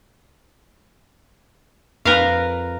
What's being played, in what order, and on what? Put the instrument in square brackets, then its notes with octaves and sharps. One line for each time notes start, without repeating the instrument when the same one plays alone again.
[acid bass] F2 [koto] A#4 B4 F5